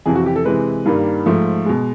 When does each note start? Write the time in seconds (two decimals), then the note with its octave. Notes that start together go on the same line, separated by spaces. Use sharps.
0.06 F2 C3 E3 G#4
0.15 F#4
0.26 G4
0.36 A4
0.45 C3 E3 G#3 B4
0.86 G2 D#3 G3 A#3
1.26 G#2 F3 A3
1.66 B2 G#3